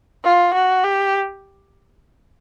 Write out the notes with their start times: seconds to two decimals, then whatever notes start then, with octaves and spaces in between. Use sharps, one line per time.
0.24 F4
0.54 F#4
0.84 G4